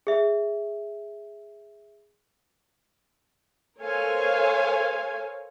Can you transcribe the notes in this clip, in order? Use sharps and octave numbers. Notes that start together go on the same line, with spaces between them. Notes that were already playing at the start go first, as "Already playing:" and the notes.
G#4 E5
A4 A#4 C5 C#5 F5 G#5